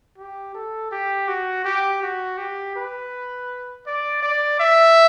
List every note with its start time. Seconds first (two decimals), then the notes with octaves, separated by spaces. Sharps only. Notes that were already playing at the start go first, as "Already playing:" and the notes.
0.17 G4
0.54 A4
0.91 G4
1.28 F#4
1.64 G4
2.02 F#4
2.38 G4
2.76 B4
3.86 D5
4.22 D5
4.59 E5